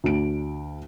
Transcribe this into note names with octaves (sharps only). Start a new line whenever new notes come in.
D2 D4 D7